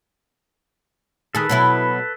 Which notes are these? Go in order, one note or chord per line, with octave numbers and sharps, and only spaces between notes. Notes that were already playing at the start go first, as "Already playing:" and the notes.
D#3 G#4 A4 B4
B2 F#3 E4